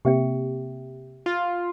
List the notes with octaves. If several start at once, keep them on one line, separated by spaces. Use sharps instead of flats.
C3 A#3 C4 G4 E5 G5
F4